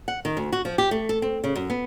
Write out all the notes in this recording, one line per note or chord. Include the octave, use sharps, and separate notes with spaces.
F#5
D#3
D2
F#4
F3
G4
A3
A4
C4
C#3
F#2
B3